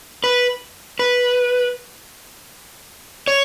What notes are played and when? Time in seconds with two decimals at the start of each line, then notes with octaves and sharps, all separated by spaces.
0.24 B4
0.99 B4
3.28 C#5